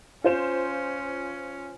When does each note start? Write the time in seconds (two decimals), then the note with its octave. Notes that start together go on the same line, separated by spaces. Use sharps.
0.24 C#4 F4 C5 E7